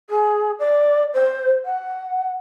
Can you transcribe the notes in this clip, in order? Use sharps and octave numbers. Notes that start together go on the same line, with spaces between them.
G#4
D5
C5
F#5